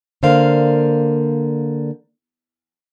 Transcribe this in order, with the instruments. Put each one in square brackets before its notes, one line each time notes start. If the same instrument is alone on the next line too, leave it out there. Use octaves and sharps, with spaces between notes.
[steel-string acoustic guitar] D3 A#3 A#4 C5 D5 F5